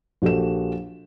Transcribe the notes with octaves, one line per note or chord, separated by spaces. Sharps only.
A#1 F#4 G4 A4 E7